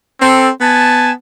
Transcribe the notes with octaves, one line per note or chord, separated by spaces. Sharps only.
C4 A4
B3 G#5 A5